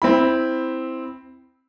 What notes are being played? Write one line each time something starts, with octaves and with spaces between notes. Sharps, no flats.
C4 E4 B5